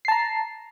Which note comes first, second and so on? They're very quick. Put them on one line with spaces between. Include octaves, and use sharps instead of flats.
C7 A5 A#5